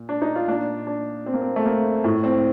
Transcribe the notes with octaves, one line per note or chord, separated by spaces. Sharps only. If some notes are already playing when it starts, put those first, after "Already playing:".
Already playing: A#2
D4
D#4
F4
A#2 D4
D4
C4
A#3
C4
A3
A#3
A2
C4